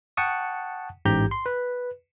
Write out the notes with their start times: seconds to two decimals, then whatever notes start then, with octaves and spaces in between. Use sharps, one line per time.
0.17 F#5 G5 A5 C#6 D#6
1.05 A1 G#2 G4 A#5 G6
1.31 C6
1.46 B4